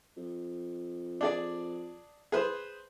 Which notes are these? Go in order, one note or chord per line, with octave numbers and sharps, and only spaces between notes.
F2
D4 G#4 D5
G#4 B4 C5